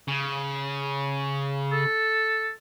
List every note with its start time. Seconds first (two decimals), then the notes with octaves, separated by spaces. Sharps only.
0.08 C#3
1.72 A4